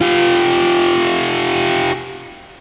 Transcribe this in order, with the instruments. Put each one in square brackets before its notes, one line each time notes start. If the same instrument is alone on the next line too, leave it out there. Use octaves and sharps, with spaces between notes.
[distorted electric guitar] F4 G4